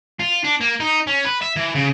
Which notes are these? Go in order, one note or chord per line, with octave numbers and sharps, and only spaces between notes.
F4
D4
A#3
D#4
C#4
B4
E5
E3
C#3